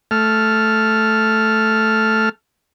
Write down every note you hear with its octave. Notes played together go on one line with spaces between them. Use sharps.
A3 F6